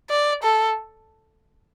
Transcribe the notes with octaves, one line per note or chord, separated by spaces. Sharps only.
D5
A4